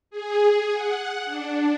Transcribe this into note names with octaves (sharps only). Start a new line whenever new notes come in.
G#4
F#5
D4